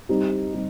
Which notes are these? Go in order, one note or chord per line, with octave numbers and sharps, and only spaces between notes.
G3 C4 D#4 G4
G3 C4